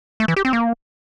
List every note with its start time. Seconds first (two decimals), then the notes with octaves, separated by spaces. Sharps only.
0.20 A3
0.28 E3
0.36 G4
0.45 C4
0.53 A#3